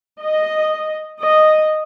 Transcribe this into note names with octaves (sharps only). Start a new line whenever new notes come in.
D#5
D#5